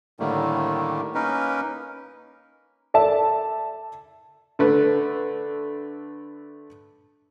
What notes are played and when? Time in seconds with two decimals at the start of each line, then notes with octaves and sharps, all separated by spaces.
0.20 A2 D3 D#3 G3 A3 A#3
1.15 A#3 C#4 D#4 A#4 B4
2.94 A4 D5 E5 A5
4.59 D3 A3 B4